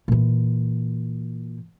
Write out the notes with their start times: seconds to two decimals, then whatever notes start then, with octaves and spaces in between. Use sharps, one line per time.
0.08 A#2 E3